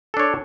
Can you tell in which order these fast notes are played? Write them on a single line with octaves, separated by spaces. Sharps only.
A4 D4 C#5